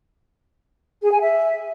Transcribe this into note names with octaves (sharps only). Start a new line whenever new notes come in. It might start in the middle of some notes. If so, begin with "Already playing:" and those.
G#4
G#5
E5